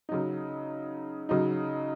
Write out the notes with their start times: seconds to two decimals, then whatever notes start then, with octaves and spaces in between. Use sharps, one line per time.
0.09 C#3 F#3 D#4
1.29 C#3 F#3 D#4